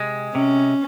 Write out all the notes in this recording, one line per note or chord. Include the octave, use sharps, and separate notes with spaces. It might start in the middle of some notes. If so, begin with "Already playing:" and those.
Already playing: C3 G#3
C3 C#4